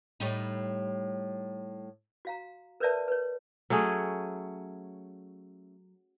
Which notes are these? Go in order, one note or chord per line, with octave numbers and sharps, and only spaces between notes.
A2 G3 D#4
F#4 F5 A#5
A#4 B4 C#5 D5 E5 A5
B4 C#5
F#3 A3 C#4 G#4